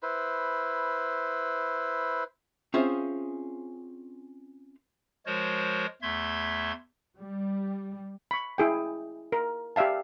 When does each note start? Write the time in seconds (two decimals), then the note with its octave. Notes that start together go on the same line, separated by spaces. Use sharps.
0.03 E4 B4 C5
2.74 C4 C#4 F4 G#4 C5 E5
5.26 F3 G#3 F#4 A#4 C5 C#5
6.02 E2 A3 E5 C6 G#6
7.19 G3
8.31 B5 C#6
8.58 E4 G#4 G5
9.32 A#4
9.76 G4 D5 E5 F5 A5